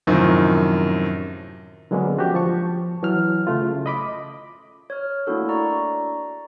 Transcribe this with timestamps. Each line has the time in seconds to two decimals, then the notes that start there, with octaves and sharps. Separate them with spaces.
0.07 F#2 A2 C3 D#3 F3
1.91 D3 F#3 G#3 A#3 B3 C#4
2.17 F3 F#4 G4
2.34 F3 A5 C#6
3.03 E3 F#3 E4 F6
3.47 C#3 A3 F4
3.86 D#5 B5 D6
4.90 C#5 F6
5.27 A3 A#3 D4 E4 F#4 A4
5.48 D5 A#5 C#6